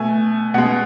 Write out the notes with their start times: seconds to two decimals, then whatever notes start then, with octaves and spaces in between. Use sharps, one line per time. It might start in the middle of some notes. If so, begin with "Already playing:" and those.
Already playing: B2 A3 G#5
0.54 B2 G#3 F#5